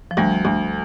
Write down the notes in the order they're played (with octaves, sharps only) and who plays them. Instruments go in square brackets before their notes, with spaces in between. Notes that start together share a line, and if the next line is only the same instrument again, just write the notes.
[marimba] F3
[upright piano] D2 [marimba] G3
[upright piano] D2